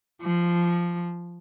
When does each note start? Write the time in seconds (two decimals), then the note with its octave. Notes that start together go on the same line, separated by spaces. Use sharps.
0.22 F3